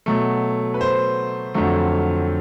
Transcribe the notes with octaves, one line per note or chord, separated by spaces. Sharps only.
B2 F#3 A3
B4
C5
F2 D3 F#3 A3